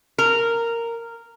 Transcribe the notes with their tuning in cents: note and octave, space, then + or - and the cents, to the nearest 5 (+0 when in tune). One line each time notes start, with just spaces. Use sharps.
A#4 -10